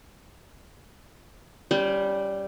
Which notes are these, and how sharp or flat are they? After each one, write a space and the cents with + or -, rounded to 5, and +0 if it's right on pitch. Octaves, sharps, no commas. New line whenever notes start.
G3 +0 C#4 +25 C5 -30